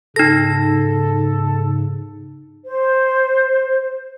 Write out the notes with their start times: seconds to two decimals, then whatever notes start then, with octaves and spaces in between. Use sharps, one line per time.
0.16 G#2 C#3 D#4 A4 A#6
2.66 C5